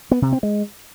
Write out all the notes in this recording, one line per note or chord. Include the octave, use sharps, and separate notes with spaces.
B3
C3
C4
G#3